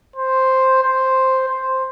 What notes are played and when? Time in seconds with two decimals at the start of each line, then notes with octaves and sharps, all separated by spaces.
0.16 C5
0.82 C5
1.49 C5